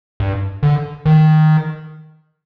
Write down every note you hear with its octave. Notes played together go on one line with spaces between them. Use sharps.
G2
D3
D#3